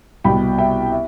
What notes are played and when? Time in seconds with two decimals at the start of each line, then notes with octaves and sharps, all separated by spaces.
0.24 C2 B2 G5 B5
0.58 E5 G5
0.92 E5